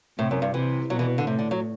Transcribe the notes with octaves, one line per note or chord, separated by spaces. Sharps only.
A2 C3
F#2
G2
C3 E3
B2 F#3
E3
D3
A2 C3
D3
F#3